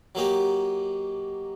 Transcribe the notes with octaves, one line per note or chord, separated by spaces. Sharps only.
F#3 A#3 D#4 G4